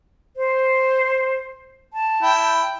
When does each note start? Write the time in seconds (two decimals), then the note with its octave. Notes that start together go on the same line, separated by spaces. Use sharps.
0.37 C5
1.94 A5
2.22 E4 G5